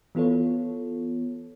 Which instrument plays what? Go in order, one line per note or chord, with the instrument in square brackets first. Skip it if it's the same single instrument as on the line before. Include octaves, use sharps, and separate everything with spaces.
[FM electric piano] E3 B3 F4 A4 C#5